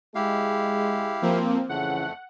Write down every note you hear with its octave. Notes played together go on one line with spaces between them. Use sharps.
G#3 E4 G4 F5
F3 A#3 C4
F2 C#3 E3 A3 F#5